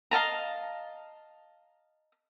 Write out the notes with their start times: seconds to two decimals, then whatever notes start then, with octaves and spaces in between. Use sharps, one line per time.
0.11 D#5 F5 A5 A#5